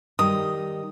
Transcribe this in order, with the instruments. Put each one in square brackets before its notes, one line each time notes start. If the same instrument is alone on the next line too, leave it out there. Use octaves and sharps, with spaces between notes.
[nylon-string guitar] D#3 G3 [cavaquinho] D#6